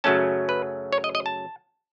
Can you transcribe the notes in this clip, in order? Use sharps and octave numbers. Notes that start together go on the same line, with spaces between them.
F#2 C#3 F#3 A3 C#4 A5
B4
C#5
D#5
D#5
A5